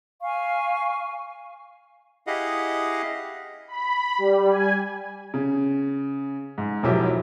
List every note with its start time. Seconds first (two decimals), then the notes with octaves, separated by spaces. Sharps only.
0.23 F5 G#5 C#6
2.27 E4 G4 G#4 D#5 F5 F#5
3.68 B5
4.18 G3
4.50 G#5
5.34 C#3
6.58 G#2
6.83 E1 B1 F3 F#3 E4 G4